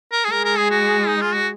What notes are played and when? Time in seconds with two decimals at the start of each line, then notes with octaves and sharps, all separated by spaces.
0.12 A#4
0.24 G#4
0.32 G#3 A#4
0.45 A#4
0.57 G#4
0.71 F#4
1.07 D#4
1.21 F4
1.34 F#4